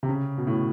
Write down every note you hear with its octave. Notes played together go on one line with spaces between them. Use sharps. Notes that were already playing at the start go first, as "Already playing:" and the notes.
C3
C#3
B2
A2